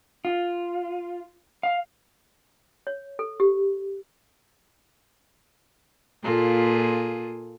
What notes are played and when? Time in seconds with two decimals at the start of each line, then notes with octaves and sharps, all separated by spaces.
0.25 F4
1.63 F5
2.87 C#5
3.19 A4
3.40 G4
6.22 A#2 A#3 F4 G#4 A4